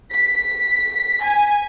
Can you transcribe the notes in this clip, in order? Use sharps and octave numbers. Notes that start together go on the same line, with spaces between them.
B6
G#5